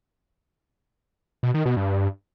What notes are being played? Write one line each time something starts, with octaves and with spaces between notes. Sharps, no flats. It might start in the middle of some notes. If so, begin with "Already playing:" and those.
B2
D#3
B2
G2